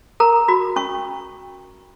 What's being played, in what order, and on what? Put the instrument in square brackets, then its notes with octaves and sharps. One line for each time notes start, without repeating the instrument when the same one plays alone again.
[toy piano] A#4 A#5
F#4 B5
C#4 C#6